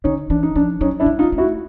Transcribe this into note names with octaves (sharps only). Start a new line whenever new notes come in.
D3 C#4 D#4
E3 D4
D#4
F3 D4
F#3 C#4 D#4
D4 E4
G3
D#4 F4
G#3
A3
E4 F#4